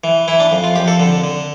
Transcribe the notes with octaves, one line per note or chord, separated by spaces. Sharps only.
E3
E3 E4
D4
F2
F4
F2 G4
A4
D3
D3